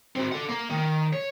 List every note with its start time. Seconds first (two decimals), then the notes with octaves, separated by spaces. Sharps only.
0.16 C4 F#4
0.32 A4 F#5
0.49 A#3
0.70 D#3
1.13 C#5